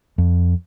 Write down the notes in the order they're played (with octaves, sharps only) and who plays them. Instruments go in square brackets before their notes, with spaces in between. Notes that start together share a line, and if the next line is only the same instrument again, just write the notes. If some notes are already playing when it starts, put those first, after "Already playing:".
[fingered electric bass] F2